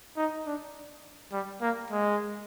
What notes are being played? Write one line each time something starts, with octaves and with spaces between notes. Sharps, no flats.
D#4
D4
G3
A#3
G#3